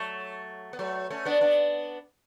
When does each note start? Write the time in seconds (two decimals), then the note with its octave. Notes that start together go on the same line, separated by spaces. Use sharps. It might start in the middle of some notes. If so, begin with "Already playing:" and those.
Already playing: F#3 A3
0.73 B3
0.79 F#3 A3
1.10 A3 C#4
1.25 B3 D4
1.41 B3 D4